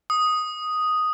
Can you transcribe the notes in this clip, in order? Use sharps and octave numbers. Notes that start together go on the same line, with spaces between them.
D#6